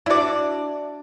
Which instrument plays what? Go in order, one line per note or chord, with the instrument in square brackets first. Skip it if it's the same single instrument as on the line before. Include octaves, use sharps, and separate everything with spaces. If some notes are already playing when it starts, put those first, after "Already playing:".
[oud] D4 F#4 [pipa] E4 D5